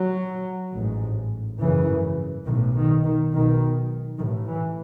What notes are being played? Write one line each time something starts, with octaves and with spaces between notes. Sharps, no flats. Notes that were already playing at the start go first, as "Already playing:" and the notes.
Already playing: F#3
A1 G#2
G#1 F#2 C#3 E3
B1 A2 D#3
D#3
D#3
B1 B2 D#3
A1 A2 D#3
E3